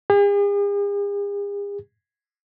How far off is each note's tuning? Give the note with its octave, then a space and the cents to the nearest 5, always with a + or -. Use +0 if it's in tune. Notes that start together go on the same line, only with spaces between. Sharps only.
G#4 -45